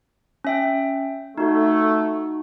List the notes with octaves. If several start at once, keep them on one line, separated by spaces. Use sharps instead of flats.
C#4 E5 G5
A3 D#4 F#4